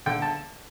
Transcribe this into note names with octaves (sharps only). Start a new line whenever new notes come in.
D3 G5
A5